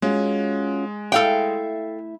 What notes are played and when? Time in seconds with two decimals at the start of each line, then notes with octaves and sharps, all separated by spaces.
0.02 G#3 C#4 F4 F#4
1.12 A3 E4 A4 E5 F5 G5